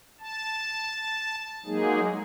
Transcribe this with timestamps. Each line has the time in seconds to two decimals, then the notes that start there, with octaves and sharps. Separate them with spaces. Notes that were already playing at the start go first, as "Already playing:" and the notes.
0.20 A5
1.66 F#3 G#3 A#3 D#4 G#4